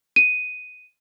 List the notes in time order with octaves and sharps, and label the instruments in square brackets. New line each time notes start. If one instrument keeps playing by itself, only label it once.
[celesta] D#7